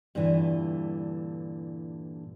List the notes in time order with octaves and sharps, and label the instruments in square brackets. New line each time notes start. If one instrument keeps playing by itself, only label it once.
[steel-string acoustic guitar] G2 A#2 D3 E3